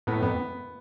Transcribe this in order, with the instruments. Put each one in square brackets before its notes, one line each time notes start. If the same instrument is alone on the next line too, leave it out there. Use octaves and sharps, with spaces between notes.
[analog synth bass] A2 [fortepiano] B3
[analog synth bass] F2 [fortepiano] B3